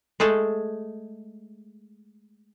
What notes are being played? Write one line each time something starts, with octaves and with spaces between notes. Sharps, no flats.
G#3 A3 G#4 A4